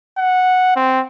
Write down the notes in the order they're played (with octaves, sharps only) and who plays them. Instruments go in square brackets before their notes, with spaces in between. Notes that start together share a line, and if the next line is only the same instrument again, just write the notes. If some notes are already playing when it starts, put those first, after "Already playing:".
[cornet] F#5
C4